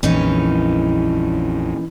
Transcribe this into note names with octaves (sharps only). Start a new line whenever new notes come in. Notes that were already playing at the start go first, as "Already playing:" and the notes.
A#1 F2 A#2 E3 C#4 D#4